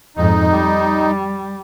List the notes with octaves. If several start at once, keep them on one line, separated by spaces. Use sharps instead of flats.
F2 G#2 D#4
G3